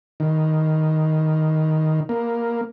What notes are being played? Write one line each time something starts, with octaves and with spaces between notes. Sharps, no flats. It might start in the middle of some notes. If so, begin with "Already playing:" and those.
D#3
A#3